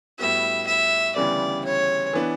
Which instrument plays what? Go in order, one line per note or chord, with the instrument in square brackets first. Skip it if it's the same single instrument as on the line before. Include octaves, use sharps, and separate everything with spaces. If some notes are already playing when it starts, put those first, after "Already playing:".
[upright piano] A2 G3 B3 F#4 [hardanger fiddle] E5
[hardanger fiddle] E5
[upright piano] D2 C#3 E3 G3 B3 [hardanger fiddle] D5
[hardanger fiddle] C#5
[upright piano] E3 B3 D4